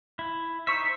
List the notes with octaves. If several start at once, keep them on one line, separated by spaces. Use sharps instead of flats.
E4
D#4 C5 E5 C#6 B6